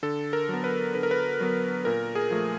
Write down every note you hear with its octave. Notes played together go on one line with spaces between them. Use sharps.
D3 A4
A#4
F#3 B3
B4
D3 B4
A#4
B4
F#3 B3
A#2 A#4
G#4
F3 A3